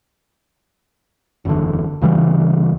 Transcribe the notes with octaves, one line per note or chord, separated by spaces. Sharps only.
F#1 E2 D3
D2 C#3 E3 G3